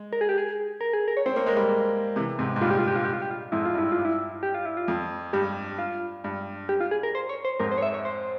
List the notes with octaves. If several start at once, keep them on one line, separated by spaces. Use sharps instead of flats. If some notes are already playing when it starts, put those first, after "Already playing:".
Already playing: G#3
A#4
G#4
G4
G#4
A#4
G#4
A#4
C#5
C4 C5
A#3 C#5
G#3 A#4
G3 A#3
C3 E3
G#2 C3
G#2
G2 A#2 F4
G4
F4
G4
F4
G4
F4
G4
F4
F2 G#2 E4
F4
G2
E4
F4
G2
E4
G4
F4
E4
F4
F2
G2 G4
F4
G2
G4
F4
G#4
A#4
C5
C#5
C5
F2 G#2 A#4
C5
C#5
E5
C#5
C5